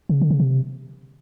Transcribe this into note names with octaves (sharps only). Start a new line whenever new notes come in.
C#3
D3
C#3
C3